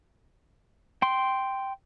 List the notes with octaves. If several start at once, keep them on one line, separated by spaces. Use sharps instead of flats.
G5 C6